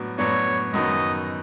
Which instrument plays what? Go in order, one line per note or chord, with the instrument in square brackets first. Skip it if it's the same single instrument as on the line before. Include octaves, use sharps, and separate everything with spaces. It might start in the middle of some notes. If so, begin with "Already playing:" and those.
Already playing: [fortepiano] A2 F#3 B3 D4 F#4
[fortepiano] A2 F#3 B3 D4 F#4 [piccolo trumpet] C#5
[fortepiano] F#2 D#3 F#3 B3 [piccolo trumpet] D#5